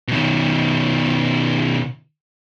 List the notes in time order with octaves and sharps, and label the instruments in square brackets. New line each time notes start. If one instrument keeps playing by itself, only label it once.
[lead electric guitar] B2 D#3